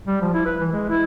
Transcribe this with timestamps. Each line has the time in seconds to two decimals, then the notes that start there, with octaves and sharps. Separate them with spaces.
0.07 G3
0.21 F3
0.34 E4
0.46 B4
0.61 E3
0.72 G#3
0.90 E4